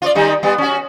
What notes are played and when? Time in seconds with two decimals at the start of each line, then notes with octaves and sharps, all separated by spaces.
0.02 F4 C#5 D5
0.15 D#3 G3 D#4
0.43 G3 B3
0.58 C#4 F#4